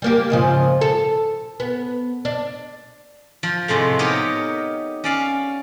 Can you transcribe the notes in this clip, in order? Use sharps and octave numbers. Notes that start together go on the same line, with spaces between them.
G3 A#3 G4
G#2 C#3 F3
A4
B3
D4
F3
A2 C3 G#3 A3
B3 D#4 G4 A#4 C#5
C#4 D5 F5